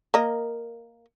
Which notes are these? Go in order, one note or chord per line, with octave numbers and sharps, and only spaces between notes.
A#3 A#4 D#5